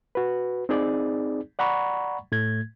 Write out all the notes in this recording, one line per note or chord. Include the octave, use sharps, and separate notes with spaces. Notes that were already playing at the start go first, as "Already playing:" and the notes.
F#4 B4
C4 D#4 G#4 D5
D5 F#5 A#5 B5 C#6
A2 A3 G#6